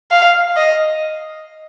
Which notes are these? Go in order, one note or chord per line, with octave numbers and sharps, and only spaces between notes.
F5
D#5